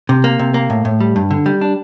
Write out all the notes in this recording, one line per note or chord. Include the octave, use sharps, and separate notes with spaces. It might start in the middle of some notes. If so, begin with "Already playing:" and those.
C3
A#3
C3
A#3
A2
A2
G3
G2
D3
G3
D4